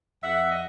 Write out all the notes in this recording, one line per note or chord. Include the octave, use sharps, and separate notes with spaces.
F2 E5 F#5
D#5